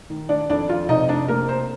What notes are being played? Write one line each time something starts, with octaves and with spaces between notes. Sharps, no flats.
D#3
D4 D5
F2 D4 D5
F4 F5
C3 D#4 D#5
D4 D5
A#3 A#4
C5